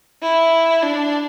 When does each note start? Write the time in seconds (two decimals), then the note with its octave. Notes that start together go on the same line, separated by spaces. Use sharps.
0.23 E4
0.83 D4